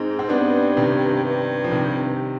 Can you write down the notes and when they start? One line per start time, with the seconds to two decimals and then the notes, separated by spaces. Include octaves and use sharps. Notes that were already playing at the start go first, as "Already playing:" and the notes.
Already playing: G#2 C4 D#4
0.19 C4
0.29 G2 B3 D4
0.77 C3 D#3
1.24 G2
1.64 F3
1.72 C3 D#3